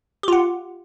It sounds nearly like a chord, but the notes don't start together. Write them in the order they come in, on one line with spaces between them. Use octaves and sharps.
G4 F4 F#5